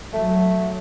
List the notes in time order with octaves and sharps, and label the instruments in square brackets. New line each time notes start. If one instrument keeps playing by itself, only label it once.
[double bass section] F#3 [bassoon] A3